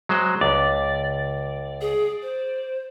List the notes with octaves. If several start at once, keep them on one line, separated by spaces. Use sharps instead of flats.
F#3 G#3 C5
C#2 D5
G#4
C5